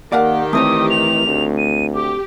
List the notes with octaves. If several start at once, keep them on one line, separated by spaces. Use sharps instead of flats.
D#3 A#3 G4 D5 F5 F#5
E3 A3 C4 C#5 D#6
F7
D2
D#7
G4 D6